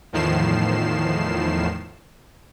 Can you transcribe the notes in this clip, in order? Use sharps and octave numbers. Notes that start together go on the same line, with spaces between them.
E2 A2 D#3 F3 C7 E7